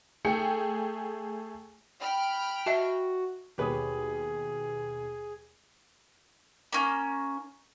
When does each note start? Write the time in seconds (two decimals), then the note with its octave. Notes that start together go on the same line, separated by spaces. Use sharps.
0.25 A3 G#4 G5 C#7
2.00 G5 B5 F6
2.66 F#4 D#5 E5 A5
3.58 D#2 B2 G4 G#4 B4 C#5 D#6
6.73 A#3 C#4